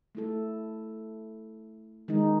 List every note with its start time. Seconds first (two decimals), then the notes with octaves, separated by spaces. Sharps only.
0.15 A3 E4 A4
2.08 D#3 G#3 D#4